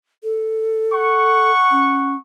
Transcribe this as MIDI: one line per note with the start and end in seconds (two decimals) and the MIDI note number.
0.24 1.51 69
0.93 2.17 78
0.93 2.17 85
1.71 2.15 61